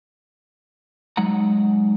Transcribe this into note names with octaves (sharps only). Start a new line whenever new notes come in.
F#3 G#3 D#4 F#5 A#5